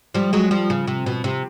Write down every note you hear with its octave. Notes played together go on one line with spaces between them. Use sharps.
F3 G3
F#3 G#3
F3 G3
C#3
C3
B2
C3